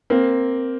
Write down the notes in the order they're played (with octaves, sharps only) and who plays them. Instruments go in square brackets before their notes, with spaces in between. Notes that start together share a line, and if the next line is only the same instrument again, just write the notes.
[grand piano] A#3 C4